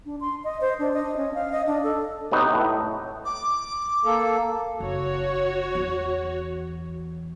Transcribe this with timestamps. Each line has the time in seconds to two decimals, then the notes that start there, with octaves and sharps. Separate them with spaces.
0.06 D4
0.21 C6
0.44 D#5
0.61 C5
0.79 D4
0.93 D#5
1.17 C#4
1.34 F5
1.52 D#5
1.67 D4
1.84 A4
2.32 C3 F#3 B3 D#4
2.53 A2
3.25 D6
4.05 A#3 A4
4.80 F#1 F#4 C#5
5.75 E2